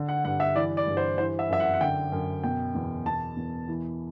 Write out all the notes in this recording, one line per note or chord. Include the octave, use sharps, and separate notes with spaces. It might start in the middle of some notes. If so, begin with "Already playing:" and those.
Already playing: D3
F#5
G2 F#5
E5
E3 D5
D5
G2
C5
E3 C5
E5
F#2 E5
F#5
F#5
D3 G5
F#2
B2 G5
E2
B2 A5
E2
E3